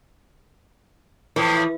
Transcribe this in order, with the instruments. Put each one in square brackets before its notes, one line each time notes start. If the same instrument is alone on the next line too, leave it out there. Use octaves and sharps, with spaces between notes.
[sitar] A2 F3 [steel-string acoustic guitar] E3